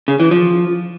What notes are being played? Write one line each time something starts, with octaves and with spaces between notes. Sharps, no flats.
C#3
E3
F3